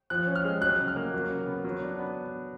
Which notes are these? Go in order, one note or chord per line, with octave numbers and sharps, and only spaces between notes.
F3 F#6
C#4
F6
G#3
F#3 F#6
C#3
F6
A#3
F#3
C#3
B3
F#3
D4
B3